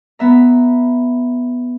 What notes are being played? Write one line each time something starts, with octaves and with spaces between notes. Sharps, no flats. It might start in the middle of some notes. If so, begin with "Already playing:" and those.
B3 E5 A#5